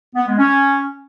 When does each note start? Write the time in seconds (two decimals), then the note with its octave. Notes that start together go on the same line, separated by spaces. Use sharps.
0.15 B3
0.26 G#3
0.38 C#4